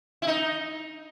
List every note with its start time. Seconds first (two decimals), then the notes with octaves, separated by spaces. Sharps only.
0.22 E4
0.27 D#4